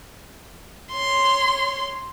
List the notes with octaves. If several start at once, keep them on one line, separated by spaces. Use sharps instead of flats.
C#5 C6